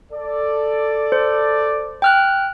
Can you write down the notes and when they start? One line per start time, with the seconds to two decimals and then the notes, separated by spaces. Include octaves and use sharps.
0.12 A4 D5
1.12 C5
2.02 G5 F6 F#6